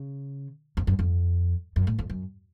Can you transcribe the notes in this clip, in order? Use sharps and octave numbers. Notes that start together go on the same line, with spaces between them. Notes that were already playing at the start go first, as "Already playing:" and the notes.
Already playing: C#3
F2
F#2
F2
F#2
A2
F2
F#2